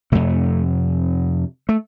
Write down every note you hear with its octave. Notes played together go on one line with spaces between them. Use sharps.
F2 C3 A3
A3